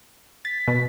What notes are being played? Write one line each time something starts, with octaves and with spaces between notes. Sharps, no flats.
A6 B6
B2